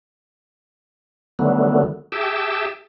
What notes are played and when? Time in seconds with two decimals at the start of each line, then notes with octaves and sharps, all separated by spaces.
1.39 D3 D#3 F#3 G3 A3 B3
2.12 G4 G#4 E5 G5 A5